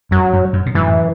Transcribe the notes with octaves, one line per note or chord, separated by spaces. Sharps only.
F#2 F#3
F#2
F#2
B2
F#2 A2 E3